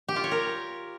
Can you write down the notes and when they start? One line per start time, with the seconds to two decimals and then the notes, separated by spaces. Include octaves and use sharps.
0.09 G4
0.16 F4
0.24 C#5
0.31 A#4